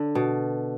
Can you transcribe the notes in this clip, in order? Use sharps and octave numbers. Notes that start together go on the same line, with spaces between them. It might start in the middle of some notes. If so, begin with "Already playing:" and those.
Already playing: D3
B2